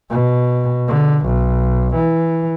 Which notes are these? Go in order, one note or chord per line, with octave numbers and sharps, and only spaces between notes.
B2
D3
B1
E3